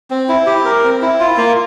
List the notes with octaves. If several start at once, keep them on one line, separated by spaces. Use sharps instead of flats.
C4
E4
G4
A#4
C4
E4
F4
A#3